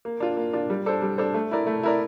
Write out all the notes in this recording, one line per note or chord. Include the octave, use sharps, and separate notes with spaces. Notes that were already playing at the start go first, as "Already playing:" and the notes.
A#3
D4 F4
A#3
D4 F4
G3
D4 A4 C5
G3
D4 A4 C5
A3
E4 A#4 D5
A3
E4 A#4 D5